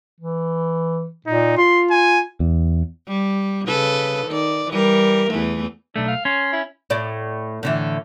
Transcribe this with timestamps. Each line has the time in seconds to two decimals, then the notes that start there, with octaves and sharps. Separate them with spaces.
0.20 E3
1.26 A#2 D#4
1.57 F4 C6
1.91 G#5
2.40 E2
3.08 G3
3.67 C#3 A4 B4
4.27 D#3 D5
4.70 E3 G3 A#4
5.30 E2 E3 A3
5.96 B1 A3 D4
6.08 F5
6.25 C#4 C6
6.53 E4
6.90 A2 D5
7.63 A2 D3 E3